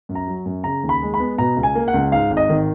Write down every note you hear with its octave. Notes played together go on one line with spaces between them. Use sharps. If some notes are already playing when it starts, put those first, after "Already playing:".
F#2
A#5
F#3
F#2
C#3 A#5
D#2
B5
G#3
B5
B3
B2 A#5
C#2
G#5
A#3
F#5
C#2
G#2 F5
G#1
D#5
D#3